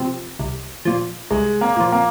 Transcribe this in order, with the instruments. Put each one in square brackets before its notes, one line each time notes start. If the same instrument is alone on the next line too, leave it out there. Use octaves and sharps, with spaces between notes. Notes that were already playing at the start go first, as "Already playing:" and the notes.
Already playing: [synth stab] C3 F3
C2
A#2 F3
[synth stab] C2 [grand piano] G#3
[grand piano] A#3
[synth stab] A#2 F3
[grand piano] A#3